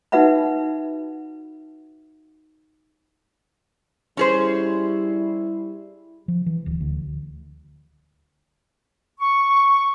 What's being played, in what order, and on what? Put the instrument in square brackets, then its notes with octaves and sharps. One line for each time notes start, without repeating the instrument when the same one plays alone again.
[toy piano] D#4 F#4 B4 E5 F#5 B5
[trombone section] G3 E4 [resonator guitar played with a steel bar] C#4 G#4 C5
[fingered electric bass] F3
E3
D1
D2
[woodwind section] C#6